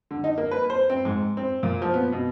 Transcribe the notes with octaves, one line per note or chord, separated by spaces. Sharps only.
D3
D#4
A#3
B4
C5
C4
G#2
C4
A#2
F3
B3
B2